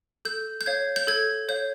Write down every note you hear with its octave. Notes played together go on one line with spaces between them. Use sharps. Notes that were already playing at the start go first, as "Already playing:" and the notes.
A4 G6
G6
C#5 F5 G#6
G6
A4 G#6
C#5 F5 G6